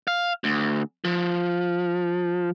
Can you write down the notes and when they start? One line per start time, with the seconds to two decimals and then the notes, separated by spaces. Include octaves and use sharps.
0.08 F5
0.44 D2
1.05 F3